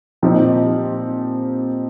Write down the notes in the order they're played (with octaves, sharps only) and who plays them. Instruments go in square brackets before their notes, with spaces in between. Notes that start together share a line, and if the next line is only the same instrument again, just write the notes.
[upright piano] A#2 F3 C4 D#4 G4